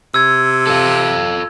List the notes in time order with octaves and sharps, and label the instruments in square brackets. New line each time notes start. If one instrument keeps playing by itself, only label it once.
[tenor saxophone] C3 [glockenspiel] E6 G#6
[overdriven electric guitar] F4 A4